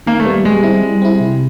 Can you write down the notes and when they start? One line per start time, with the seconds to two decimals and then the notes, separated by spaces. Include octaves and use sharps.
0.06 D#3 A#3
0.20 A3
0.25 G3 B3
0.45 G3 G#3
0.63 C4 E4
0.82 G3
1.02 C4 E4
1.20 C3